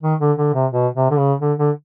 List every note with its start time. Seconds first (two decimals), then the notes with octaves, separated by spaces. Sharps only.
0.03 D#3
0.20 D3
0.38 D3
0.54 C3
0.72 B2
0.95 C3
1.11 D3
1.18 C#3
1.41 D3
1.58 D3